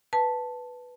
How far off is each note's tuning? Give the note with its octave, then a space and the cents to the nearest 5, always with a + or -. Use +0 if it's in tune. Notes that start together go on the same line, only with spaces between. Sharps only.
B4 +0 A5 +0